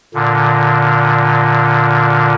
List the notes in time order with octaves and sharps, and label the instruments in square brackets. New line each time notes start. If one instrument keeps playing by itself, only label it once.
[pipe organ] A#2 D3